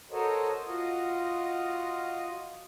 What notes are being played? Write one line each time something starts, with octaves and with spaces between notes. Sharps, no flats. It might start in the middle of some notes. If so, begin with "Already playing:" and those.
F#4 A4 A#4 C5 C#5 D#5
F4 F#4 D#5